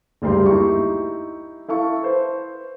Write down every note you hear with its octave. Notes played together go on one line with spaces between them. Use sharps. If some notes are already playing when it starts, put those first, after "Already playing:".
F#1 D2 G2 A#3 G4 C6
D#4 E4 G4 C#6
E4 A4 F5 C#6
B4 C5